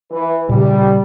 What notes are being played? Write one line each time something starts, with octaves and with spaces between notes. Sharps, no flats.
E3 B4
A#2 C#3 G3